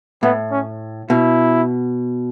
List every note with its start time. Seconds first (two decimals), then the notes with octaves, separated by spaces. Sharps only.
0.23 A2 B3
0.51 C#4
1.10 B2 E4